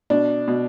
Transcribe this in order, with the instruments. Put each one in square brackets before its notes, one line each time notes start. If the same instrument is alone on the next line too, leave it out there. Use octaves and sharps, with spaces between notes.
[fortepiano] B2 D4
B2